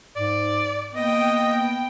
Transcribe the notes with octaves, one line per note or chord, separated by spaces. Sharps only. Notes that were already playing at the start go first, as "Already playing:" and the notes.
G#2 D5
A#3 B3 D#5 G5